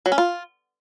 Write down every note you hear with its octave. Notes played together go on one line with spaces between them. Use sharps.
F#3
C#4
F4